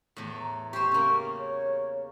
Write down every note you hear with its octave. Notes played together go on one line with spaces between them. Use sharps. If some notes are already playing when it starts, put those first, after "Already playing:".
E2 A2
A#5
G4 C5 C#6
C#3 A#3
C#5